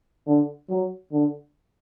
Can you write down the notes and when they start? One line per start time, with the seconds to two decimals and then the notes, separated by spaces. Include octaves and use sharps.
0.27 D3
0.69 F#3
1.12 D3